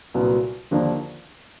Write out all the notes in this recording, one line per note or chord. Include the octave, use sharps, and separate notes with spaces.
C2 A#2 F#3 B3
D#2 D3 F3 A#3 D4